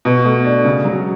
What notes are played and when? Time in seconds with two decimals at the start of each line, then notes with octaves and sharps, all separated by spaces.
0.05 B2
0.25 A3
0.45 D4
0.65 C#3
0.85 F#3